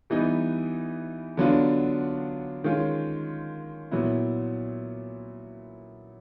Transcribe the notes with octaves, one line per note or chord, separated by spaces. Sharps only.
E3 G3 B3 D#4
D3 F#3 B3 D4 F4
D#3 G#3 C#4 F4
A#2 F#3 B3 E4